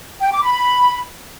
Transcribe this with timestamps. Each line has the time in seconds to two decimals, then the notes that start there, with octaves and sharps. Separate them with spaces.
0.22 G5
0.33 D6
0.44 B5